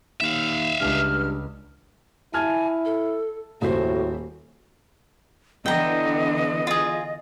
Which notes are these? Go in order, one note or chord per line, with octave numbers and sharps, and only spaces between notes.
D#2 E5 F5
C#2 G2 F6
E4 G#5 A5 F6 G#6
A4
D#1 A2 F#4 C5
D3 E3 B3 D#5 G5 A#5
F4 G#4